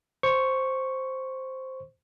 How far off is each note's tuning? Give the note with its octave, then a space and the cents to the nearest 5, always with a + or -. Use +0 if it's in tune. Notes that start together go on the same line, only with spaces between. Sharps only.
C5 +0 C#6 +0